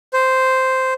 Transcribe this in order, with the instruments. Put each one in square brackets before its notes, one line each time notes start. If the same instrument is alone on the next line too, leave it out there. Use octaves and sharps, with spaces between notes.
[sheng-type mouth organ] C5